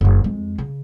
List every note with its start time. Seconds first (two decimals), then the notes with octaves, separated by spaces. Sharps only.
0.01 F#1 D3
0.24 F2 G#3
0.58 C#3